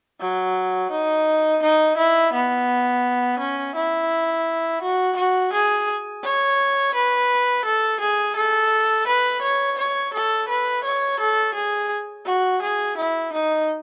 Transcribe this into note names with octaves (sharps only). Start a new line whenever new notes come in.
F#3
D#4
D#4
E4
B3
C#4
E4
F#4
F#4
G#4
C#5
B4
A4
G#4
A4
B4
C#5
C#5
A4
B4
C#5
A4
G#4
F#4
G#4
E4
D#4